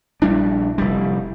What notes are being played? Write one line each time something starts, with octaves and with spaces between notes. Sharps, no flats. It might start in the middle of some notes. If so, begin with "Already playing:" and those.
A#1 G3 D4 E4
F1 G3